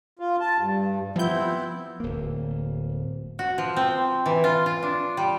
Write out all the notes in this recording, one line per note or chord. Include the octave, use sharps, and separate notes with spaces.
F4
A5
G2
F3 B3 C4 E4 G6
D1 A#3
F#4
F3
C4
E3
F4
F4
D4
G3